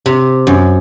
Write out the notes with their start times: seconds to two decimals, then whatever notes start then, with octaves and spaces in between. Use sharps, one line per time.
0.06 C3
0.47 F#2